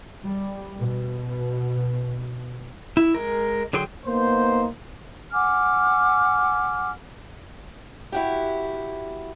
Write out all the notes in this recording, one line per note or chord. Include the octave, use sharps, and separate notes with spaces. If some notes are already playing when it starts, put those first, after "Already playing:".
G3
B2
E4
G#3 A#4
D3 F#3 G#4 G5 C6
A#3 B3 D#4 C5
F#5 G#5 D6 F6
E4 F#4 G4